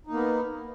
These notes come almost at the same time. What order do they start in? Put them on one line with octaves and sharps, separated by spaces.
D#4 A#3 B3